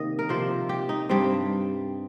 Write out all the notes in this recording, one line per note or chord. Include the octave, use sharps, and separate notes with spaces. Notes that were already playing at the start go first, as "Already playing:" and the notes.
Already playing: C3 D#3 A#3 D#5
A#4
C3 F3 A#3 C5
G4
D#4
G2 G3 C4